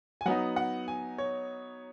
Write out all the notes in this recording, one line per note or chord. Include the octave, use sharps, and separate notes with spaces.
G#5
F#3 B3 D#4 F#5
F#5
G#5
C#5